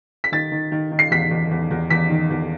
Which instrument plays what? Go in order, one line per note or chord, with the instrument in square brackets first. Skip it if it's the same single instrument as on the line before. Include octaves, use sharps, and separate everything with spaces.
[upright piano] B6
D#3 A6
D#3
D#3
D#3
C7
E2 B6
E2
E2
E2
E2 B6
D#3
E2